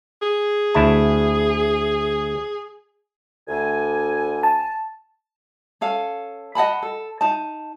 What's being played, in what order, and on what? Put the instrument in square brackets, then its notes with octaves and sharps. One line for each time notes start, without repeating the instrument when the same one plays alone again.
[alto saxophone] G#4
[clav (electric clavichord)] D2 E4 A5
[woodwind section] D2 G#5
[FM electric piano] A5
[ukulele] C#4 A4 F5
D#5 F#5 A5 B5
A4
D#4 A5